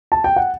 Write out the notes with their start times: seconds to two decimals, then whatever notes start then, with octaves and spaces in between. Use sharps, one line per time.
0.12 A5
0.24 G5
0.36 F#5